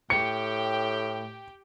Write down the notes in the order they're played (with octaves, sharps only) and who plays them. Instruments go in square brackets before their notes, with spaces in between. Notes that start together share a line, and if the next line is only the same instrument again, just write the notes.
[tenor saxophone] A2 [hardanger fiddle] G4 G5 [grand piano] C#7